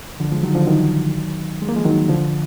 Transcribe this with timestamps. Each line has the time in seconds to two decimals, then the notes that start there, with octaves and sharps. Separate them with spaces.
0.20 D3 F3
0.31 F3 G#3
0.43 D#3 F#3
0.55 D3 F3
0.67 D#3 F#3
1.62 G#3
1.69 A#3
1.76 F3 G#3
1.85 D#3 F#3
2.09 D3 F3